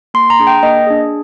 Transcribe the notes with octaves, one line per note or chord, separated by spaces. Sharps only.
A#3 C6
A#5
D4 G#4
G5
A#3 D#5
D4 G#4